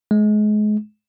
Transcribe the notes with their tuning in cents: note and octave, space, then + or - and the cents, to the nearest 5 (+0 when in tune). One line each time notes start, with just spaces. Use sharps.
G#3 +30